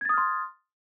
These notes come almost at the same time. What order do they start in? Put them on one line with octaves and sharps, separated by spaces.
G#6 A6 D#6 F6 C6